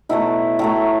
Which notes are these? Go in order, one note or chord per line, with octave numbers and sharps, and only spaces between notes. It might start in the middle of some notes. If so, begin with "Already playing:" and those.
B2 F#3 A3 E4
A2 F#3 A3 E4